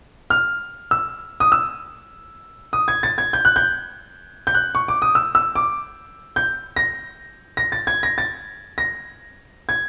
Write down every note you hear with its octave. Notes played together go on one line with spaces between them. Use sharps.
F6
E6
D#6
E6
D#6
G#6
A6
G#6
G6
F#6
G6
G6
F#6
C#6
D6
D#6
E6
E6
D6
G6
A#6
A#6
A6
G#6
A#6
A6
A#6
G#6